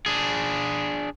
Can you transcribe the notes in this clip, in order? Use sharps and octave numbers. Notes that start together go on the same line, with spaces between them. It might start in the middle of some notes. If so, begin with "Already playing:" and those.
D4 G#4